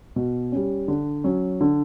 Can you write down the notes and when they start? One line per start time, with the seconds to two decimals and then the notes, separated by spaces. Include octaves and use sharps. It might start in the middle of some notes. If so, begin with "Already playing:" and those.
0.16 B2
0.52 G3 C#4
0.88 D3
1.24 F#3 C#4
1.61 D3